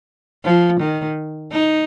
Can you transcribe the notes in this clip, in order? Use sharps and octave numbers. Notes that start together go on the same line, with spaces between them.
F3
D#3
D#4